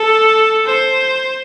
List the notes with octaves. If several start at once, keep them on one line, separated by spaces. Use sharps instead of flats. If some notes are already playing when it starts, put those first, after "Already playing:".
Already playing: A4
C5